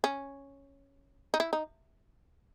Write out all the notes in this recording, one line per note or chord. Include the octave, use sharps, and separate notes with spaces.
C#4
D#4
E4
D#4